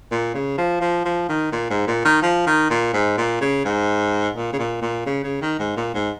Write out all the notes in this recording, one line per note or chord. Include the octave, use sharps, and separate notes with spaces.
A#2
C#3
F3
F3
F3
D#3
A#2
G#2
A#2
D#3
F3
D#3
A#2
G#2
A#2
C#3
G#2
A#2
C#3
A#2
A#2
C#3
C#3
D#3
G#2
A#2
G#2